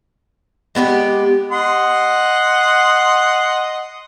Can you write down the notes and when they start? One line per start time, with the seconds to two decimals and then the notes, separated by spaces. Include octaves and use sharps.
0.75 G#3 B3 E4 G4
1.51 D#5 F#5 C6